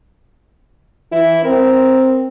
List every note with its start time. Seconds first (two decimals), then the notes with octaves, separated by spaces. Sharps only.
1.12 E3 E4
1.44 C4 A#4